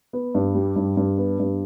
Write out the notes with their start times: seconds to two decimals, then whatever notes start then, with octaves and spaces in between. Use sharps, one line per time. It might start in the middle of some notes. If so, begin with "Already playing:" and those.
0.13 B3
0.35 G2
0.55 G3
0.76 G2
0.97 G2
1.18 B3
1.40 G2